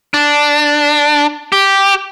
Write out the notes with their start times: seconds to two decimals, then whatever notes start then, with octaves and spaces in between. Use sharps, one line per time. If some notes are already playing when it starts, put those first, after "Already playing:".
0.14 D4
1.52 G4